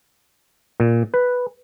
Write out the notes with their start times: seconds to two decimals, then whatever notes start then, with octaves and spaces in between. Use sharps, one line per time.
0.80 A#2
1.14 B4